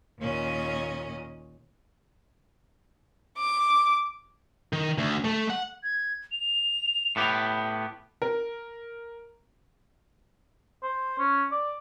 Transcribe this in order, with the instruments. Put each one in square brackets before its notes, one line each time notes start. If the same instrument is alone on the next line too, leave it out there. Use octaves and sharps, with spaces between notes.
[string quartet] D#2 A#2 C#4 D#5
[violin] D6
[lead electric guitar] D#3
D2
A3
F#5
[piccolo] G#6
F7
[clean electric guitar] A2 B3 G4
[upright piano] A#4
[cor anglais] C5
C#4
D5